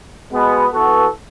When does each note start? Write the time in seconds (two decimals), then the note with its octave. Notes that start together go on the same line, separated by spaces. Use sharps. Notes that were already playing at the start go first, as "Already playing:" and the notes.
0.31 B2 G#3 B3
0.73 E3 B3 F#4 A4